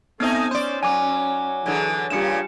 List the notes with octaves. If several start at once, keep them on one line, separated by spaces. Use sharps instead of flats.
A3 B3 C4 D#4 D#5 G#5 F6
C#4 C5 D5 C6
F#3 G#5 D6
D3 E3 F#3 G#4
G2 A#2 C#3 G3 F4 G4 C#7 E7